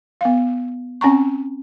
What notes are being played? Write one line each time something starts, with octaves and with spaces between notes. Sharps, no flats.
B3 F5
C4 C#4 G5 A#5 C#6